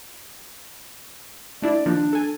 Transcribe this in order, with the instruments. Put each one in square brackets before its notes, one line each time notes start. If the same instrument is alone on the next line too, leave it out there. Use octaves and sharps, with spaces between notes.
[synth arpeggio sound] A3 D4 E4 [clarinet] D5
[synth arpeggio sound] D#3 F3 A#3 [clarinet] D4
[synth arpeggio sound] A4 G#5